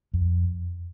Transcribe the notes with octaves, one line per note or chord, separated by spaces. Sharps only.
F2